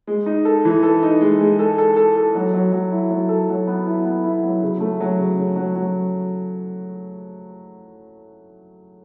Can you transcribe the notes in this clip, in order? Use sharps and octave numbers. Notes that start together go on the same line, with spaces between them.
G#3
D#4
A4
E3
A4
D#4
G#3
G#3
A4
A4
A4
A4
F#3
F#3
F#3
E4
F#3
A4
F#3
B3
E4
B3
E4
F#3
C#3
A3
F#3
C#3
C#3
F#3
F#3